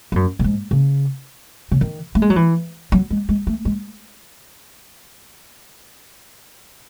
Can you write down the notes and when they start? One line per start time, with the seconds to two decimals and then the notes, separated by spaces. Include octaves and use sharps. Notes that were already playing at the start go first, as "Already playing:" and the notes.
0.12 G#2
0.16 F#2
0.39 A2
0.44 G#2
0.71 C#3
1.72 C#3
1.81 D#3
2.15 A3
2.22 G#3
2.30 F#3
2.36 E3
2.92 F#3
3.11 G#3
3.29 G#3
3.47 A3
3.65 G#3